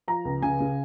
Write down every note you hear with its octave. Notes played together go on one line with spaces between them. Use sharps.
F3 A#5
C#2
C#3 G#5
C#3